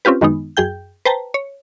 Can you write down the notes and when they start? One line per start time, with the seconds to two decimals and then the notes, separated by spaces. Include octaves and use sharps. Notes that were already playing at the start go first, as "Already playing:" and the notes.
0.05 C4 C#4 F4 G4 B4
0.21 F#2 D#3 G#3 B3 D#4
0.57 F#2 G#4 G5 G6
1.05 B4 C5 G5 A5 A#5
1.34 C#5